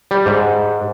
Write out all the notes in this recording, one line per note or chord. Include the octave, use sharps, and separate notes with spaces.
G3
G#2